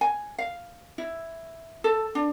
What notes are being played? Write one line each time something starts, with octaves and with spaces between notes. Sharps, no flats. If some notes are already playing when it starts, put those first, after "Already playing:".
G#5
F5
E4
A4
D4